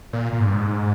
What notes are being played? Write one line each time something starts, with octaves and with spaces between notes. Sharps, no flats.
A#2
A#2
G#2
G2
G#2